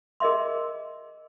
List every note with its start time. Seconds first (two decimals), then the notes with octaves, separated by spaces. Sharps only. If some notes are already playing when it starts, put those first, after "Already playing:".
0.20 G#4 A#4 D#5 E5 C6